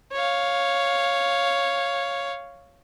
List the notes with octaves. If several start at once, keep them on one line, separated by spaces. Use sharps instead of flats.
C#5 F5